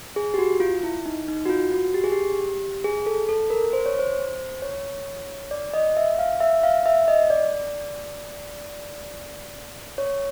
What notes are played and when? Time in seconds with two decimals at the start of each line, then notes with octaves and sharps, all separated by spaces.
0.16 G#4
0.34 G4
0.38 F#4
0.60 F4
0.83 E4
1.06 D#4
1.28 D#4
1.46 F#4
1.49 F4
1.72 F#4
1.94 G4
2.04 G#4
2.12 G4
2.84 G#4
3.06 A4
3.29 A4
3.50 A#4
3.73 C5
3.86 C#5
3.99 C5
4.62 C#5
5.51 D5
5.74 D#5
5.97 E5
6.19 F5
6.40 E5
6.63 F5
6.86 E5
7.08 D#5
7.30 D5
9.98 C#5